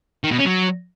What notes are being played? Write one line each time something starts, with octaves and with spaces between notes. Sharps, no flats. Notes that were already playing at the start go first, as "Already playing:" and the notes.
D#3
B2
C#4
F#3